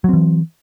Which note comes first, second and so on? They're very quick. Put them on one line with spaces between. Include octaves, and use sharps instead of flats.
F#3 C4 E3